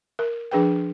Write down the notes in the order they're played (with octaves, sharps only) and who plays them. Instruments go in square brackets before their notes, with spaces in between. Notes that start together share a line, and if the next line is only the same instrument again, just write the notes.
[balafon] A#4
F3 D4 G#4 B4 G5